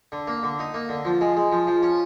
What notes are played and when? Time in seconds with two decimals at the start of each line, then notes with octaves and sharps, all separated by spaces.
0.12 D3
0.27 A#3
0.43 D3
0.59 D#4
0.74 A#3
0.89 D3
1.05 F3
1.21 G#3
1.37 G#3
1.52 F3
1.67 F3
1.83 C#4